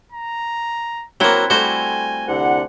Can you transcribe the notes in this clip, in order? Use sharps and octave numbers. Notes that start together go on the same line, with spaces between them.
A#5
F#3 A#3 C4 E4 F#4
G3 A3 F#4 C5 G#5
C2 D3 F#5